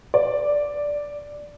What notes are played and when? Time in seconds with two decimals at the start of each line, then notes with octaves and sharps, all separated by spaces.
0.14 D5